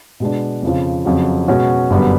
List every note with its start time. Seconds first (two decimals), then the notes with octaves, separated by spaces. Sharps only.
0.20 B2 G#3 B3 D4
0.63 F2 C#3 F3
1.05 F2 C#3 F#3
1.48 B2 G#3 C#4 F#4
1.90 G1 F#2 D3 G3 B3